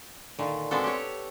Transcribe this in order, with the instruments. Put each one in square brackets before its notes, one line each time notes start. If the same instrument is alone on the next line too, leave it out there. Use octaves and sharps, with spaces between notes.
[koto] A#2 D3 D#3
G#3 B3 C4 D4 F#4 A4
G4 C#5